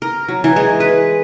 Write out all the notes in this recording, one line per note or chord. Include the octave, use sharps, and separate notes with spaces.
A#4
F#3
E3
G#3
B4